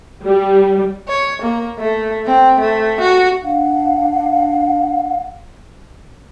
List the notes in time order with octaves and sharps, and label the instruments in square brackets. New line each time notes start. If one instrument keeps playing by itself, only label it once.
[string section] G3
[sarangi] C#5
A#3
A3
C4
A3
F#4
[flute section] D4 F5 F#5